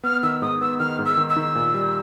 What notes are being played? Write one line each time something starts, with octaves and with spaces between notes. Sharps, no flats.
B3 F6
D#3 E6
G#2 D#6
B3 E6
D#3 F6
G#2
E6
D#3
E6
D#3
A#2
G3